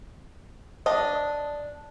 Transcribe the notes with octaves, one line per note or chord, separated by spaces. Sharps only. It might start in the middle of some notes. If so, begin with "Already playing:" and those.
D4 D#5